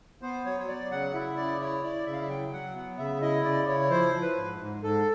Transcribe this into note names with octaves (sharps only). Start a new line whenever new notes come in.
B3 C5
F#3 C#5
C#5
F#3 D5
C#3 F#5
E4 E5
C#3 D5
E4 C#5
E4 D5
C#3 E5
F5
E5
F#3 G5
F#3 F#5
B3
C#3 E5
E4 D#5
C#3 D5
E4 C#5
F3 C5
F3
B4
G#2
G#2
G#2 A4